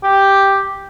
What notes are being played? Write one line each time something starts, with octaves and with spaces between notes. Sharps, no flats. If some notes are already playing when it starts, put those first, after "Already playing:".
G4